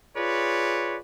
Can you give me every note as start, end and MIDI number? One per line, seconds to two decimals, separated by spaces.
0.17 0.98 65
0.17 0.98 68
0.17 0.98 71
0.17 0.98 73
0.17 0.98 74